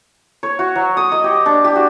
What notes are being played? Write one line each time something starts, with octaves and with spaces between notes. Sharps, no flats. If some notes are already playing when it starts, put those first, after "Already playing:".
C#5
F#4
F#3
D#6
D#5
G4
D4
G4
F#4